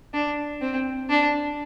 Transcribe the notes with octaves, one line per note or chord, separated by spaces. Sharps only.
D4
C4
D4